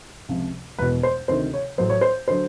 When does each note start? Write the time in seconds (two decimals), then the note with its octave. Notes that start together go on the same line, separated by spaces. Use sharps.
0.29 C#2 C3 F3
0.79 E1 E2 B2 B4
1.03 C5
1.28 D2 C3 D#3 C5
1.53 C#5
1.78 A1 A2 F#3 C5
1.90 C#5
2.01 C5
2.28 D3 F#3 C5